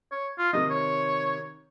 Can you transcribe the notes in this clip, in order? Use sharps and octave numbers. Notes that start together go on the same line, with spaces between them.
C#5
F4
C3 D#3 D#5
C#5